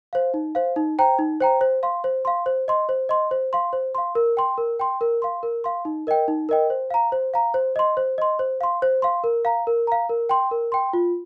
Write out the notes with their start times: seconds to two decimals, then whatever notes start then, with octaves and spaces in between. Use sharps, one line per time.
0.13 C5 F5
0.34 D#4
0.55 C5 F5
0.76 D#4
0.98 C5 G5 A#5
1.19 D#4
1.40 C5 G5 A#5
1.61 C5
1.83 F5 C6
2.04 C5
2.25 F5 C6
2.46 C5
2.68 D#5 C6
2.89 C5
3.09 D#5 C6
3.31 C5
3.53 F5 C6
3.73 C5
3.95 F5 C6
4.15 A#4
4.37 G5 C6
4.58 A#4
4.80 G5 C6
5.01 A#4
5.22 F5 C6
5.43 A#4
5.64 F5 C6
5.85 D#4
6.07 A#4 D#5 G5
6.28 D#4
6.49 A#4 D#5 G5
6.70 C5
6.91 F5 A#5
7.12 C5
7.34 F5 A#5
7.54 C5
7.76 D#5 C6
7.97 C5
8.18 D#5 C6
8.39 C5
8.61 F5 C6
8.82 C5
9.02 F5 C6
9.24 A#4
9.45 F5 A#5
9.67 A#4
9.87 F5 A#5
10.09 A#4
10.29 G5 C6
10.51 A#4
10.72 G5 C6
10.93 F4